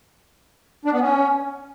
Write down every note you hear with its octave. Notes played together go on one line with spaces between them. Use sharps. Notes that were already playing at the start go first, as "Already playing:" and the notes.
D4
B3
C#4